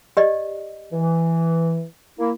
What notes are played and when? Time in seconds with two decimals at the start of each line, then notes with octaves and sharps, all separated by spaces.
0.17 G4 D5 D#5
0.92 E3
2.19 A#3 E4